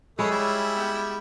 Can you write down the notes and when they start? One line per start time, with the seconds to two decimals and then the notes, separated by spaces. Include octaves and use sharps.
0.19 G#3 A3 G#4 C#5 B5 E6
0.31 G3 E4
0.76 B3 G5